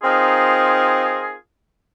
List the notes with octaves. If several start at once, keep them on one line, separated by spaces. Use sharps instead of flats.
C4 D#4 F4 G#4 A#4